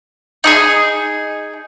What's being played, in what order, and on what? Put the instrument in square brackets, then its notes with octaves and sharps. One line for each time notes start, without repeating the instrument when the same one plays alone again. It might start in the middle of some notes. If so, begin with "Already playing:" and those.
[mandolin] D#4 E4 G#4